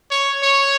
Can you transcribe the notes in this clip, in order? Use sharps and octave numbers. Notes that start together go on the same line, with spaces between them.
C#5
C#5